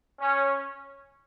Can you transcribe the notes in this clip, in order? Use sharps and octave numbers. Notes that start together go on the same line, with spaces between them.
C#4